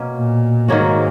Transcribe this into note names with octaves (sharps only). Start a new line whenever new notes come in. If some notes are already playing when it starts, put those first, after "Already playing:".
Already playing: B2 A#3 C#4
A#2
G#2 D#3 A#3 C#4 F#4